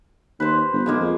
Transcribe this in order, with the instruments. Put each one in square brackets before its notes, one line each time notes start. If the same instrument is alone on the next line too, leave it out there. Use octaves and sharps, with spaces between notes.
[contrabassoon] D#2 [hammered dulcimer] B4 C5
[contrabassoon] G1
[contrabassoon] B1 [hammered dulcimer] F3 G#3 A#3
[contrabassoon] F2